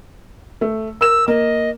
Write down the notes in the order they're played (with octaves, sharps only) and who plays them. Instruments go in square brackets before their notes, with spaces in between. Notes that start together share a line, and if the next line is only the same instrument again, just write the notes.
[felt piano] A3
[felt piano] A#4 E7 [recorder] E6
[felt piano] A#3 [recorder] D#5